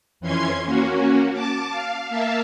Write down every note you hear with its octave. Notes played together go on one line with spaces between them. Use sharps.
F2 E3 C#4 C6 G#6
A#3 C#4 F#4
A5 D6
F5
A#3 E5 F5 A5